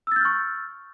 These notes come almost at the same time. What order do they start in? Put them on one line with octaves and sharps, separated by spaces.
E6 A6 G6 F6 C#6